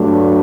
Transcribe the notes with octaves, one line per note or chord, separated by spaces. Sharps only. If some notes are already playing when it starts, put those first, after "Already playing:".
Already playing: G2 F#3 A3 D4